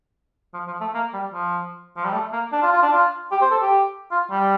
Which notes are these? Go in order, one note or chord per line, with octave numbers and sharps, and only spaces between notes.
F3
F3
A3
A#3
G3
F3
F3
G3
A3
A#3
D4
F4
F4
D4
F4
G4
C5
A4
G4
F4
G3